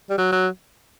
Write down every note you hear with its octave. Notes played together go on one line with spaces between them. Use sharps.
G3
F#3
F#3